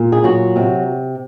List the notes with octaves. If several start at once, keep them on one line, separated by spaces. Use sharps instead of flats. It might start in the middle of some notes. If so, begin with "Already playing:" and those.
Already playing: A#2
G#4
F#3 F#4
C3